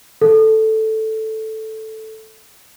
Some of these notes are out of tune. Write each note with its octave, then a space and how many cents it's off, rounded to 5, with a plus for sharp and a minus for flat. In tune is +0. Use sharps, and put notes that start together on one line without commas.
A4 +0